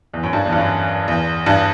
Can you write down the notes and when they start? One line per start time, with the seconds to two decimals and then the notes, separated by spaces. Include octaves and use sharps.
0.14 E2
0.23 F#2
0.33 G2
0.46 E2
0.52 G2
0.58 F#2
1.08 E2
1.46 G2